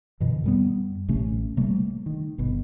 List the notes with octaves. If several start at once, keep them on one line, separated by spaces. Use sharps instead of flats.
F#2 B2 D3 E3
F#2 G3 B3
A1 C3 A3 C#4
C3 G3 A3 A#3
D#3
G1 B2